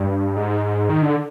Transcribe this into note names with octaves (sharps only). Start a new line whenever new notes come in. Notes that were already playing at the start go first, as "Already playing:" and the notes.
Already playing: G2
G#2
D#3
D3